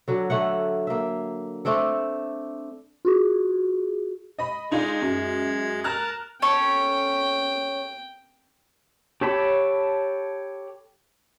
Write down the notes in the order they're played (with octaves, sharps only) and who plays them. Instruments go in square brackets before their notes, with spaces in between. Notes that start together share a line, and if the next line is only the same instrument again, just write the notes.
[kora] D3 F#3
D3 A3 F#5
A#3 E5
A3 C4 D4 A4
[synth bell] F4 F#4 G#4
[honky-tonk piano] D#5 B5
[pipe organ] G#3 G#6 [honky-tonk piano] D4 D#4 F4
[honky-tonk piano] F#2
[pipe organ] A#4 A5 [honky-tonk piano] A#5 F6 F#6
[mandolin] C#4 A4 C#5 [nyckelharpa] G5
[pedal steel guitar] G4 A4 C#5 A5 B5